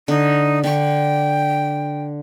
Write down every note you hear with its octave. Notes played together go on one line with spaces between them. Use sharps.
D3 D#4
D3 G5 C#6